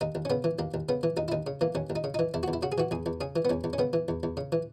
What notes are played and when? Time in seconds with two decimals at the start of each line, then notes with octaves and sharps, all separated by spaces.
0.01 D#2 D#4
0.15 D#2
0.25 C#4
0.30 C#3 B3
0.44 E3
0.59 D#2 A#3
0.74 D#2
0.89 C#3 B3
1.03 E3
1.17 D#2 D#4
1.28 E4
1.32 D#2 D#4
1.47 C#3
1.61 E3 A#3
1.75 D#2 C#4
1.90 D#2
1.96 D#4
2.04 C#3
2.14 E3 D#4
2.34 E2 E4
2.43 F#4
2.48 E2
2.53 E4
2.62 C#3 F#4
2.72 G#4
2.78 E3 F#4
2.91 E2 G#4
3.06 E2
3.21 C#3 G#4
3.36 E3
3.45 B3
3.49 E2 C#4
3.64 E2
3.73 C#4
3.79 C#3 B3
3.93 E3
4.08 E2
4.23 E2
4.37 C#3
4.52 E3